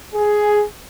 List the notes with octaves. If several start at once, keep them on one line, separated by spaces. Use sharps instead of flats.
G#4